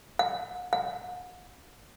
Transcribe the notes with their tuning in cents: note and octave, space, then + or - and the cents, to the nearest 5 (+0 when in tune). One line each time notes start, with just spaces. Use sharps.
F#5 -40
F#5 -40